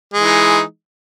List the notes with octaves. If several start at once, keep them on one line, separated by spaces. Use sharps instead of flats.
E3 G#3 D#4